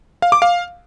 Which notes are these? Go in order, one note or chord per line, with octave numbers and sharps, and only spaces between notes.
F5
D6
F5